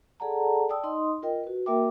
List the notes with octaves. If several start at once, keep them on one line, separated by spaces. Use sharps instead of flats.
G#4 A4 D5 F#5 A5 A#5
D5 G5 A5 D#6 E6
D#4 D#5 C6 D#6
F4 A#4 D#5 G5
F#4 B4
A#3 F#4 A#4 E5 G5 D6